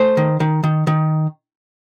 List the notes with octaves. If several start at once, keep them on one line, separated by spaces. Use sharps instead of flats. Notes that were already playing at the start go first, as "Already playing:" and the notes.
Already playing: A3 C5
D#3
D#3
D#3
D#3